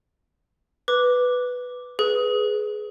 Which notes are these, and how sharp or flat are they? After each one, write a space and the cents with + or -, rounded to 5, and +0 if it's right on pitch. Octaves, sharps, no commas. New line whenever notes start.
B4 +0 D6 +0
G#4 +20 B4 +0